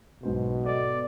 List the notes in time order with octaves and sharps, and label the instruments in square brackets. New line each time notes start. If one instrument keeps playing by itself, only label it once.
[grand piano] B1 G#2 C5 [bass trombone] B2
[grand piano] A4 D#5 [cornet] D5